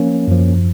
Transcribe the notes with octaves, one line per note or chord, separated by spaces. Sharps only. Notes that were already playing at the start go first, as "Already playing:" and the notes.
Already playing: F3 A#3 C#4
F#2 F3